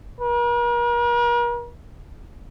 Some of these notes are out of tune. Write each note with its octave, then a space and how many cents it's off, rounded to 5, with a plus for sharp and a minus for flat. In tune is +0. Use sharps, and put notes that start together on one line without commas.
A#4 +45